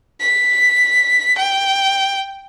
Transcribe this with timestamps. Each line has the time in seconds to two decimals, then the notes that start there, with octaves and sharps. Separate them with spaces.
0.21 B6
1.38 G5